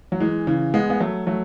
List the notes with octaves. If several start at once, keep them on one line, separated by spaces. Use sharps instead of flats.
F#3
E3 G#3
C#3 E3
G#3 B3
B3
F#3 A3
F#3 A3